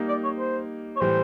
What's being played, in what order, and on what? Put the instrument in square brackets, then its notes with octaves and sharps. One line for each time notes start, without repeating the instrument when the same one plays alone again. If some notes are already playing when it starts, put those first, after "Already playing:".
Already playing: [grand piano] G3 A#3 D#4
[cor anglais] D5
C#5
C5
C#5
[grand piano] A2 E3 G3 [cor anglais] C5